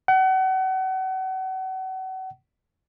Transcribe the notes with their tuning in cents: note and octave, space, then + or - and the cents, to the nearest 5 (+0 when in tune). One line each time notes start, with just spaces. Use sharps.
F#5 +35